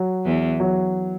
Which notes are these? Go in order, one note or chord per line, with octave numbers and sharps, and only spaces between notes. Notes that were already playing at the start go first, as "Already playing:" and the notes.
Already playing: F#3
E2 E3
F#3